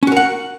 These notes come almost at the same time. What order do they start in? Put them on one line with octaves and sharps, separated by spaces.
C#4 F#4 A#4 F#5